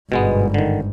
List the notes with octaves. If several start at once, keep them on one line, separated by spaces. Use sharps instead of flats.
G1 G#2 B2 G#3 B3
D3 D#3